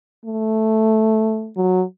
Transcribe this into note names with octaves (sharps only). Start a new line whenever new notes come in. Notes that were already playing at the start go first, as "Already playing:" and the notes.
A3
F#3